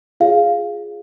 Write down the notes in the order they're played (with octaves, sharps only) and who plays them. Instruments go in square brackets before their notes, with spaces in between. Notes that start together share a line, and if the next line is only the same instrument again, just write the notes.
[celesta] F4 G#4 C#5 F5